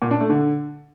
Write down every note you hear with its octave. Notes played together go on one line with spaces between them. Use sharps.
A#2
D4
A3
D3